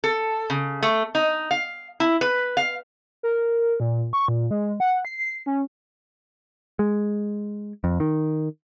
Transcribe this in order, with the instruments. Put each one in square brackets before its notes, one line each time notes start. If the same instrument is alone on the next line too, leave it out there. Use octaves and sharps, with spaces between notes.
[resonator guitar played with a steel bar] A4
C#3
A3
D#4
F5
E4
B4
F5
[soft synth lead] A#4
A#2
C#6
A#2
G#3
F#5
C7
C#4
[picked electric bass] G#3
F2
D#3